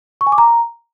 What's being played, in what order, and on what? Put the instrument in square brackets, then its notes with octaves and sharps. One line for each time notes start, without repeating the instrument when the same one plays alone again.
[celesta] C#6
G#5
D6
A#5